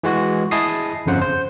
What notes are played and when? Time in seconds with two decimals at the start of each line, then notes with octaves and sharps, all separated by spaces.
0.03 E3 G#3 F#4
0.51 E4 G#4 D#5 A5 D#6 C7
1.06 G1 F2 C#3 C5 F#5
1.22 C5